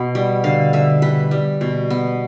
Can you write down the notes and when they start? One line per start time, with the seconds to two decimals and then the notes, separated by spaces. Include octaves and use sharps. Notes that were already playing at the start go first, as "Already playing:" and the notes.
Already playing: B2 B3
0.15 G3
0.44 D3 F5
0.73 D3 E5
1.02 G3 B4
1.31 G3
1.61 B2
1.90 B3